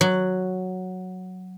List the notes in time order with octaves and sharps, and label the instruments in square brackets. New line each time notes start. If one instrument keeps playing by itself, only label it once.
[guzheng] F#3